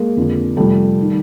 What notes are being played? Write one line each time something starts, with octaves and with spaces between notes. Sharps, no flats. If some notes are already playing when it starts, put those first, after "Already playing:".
Already playing: G#3 A#3
F2 D3 F3
F2 C3 F3 G3 A3
D#3